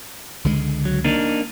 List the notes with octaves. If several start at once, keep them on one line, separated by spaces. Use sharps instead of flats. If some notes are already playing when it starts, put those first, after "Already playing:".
C#2 D3 G#3
F#3
A#3 D4 D#4